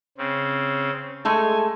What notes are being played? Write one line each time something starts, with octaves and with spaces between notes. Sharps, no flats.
C#3 C4
G#3 A3 A4 G#5